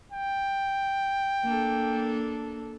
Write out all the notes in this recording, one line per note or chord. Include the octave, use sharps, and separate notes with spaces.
G5
A#3 D4 A4